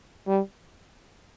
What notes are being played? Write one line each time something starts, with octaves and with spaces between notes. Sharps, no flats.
G3